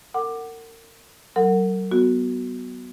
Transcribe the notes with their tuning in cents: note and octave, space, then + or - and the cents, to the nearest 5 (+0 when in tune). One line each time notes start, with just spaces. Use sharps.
A#4 -35 F#5 +10 D6 +15
F#3 +35 A#4 -35 F#5 +0
B3 +0 F#4 +0